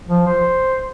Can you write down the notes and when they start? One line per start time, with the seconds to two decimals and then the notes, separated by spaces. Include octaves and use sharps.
0.09 F3
0.27 C5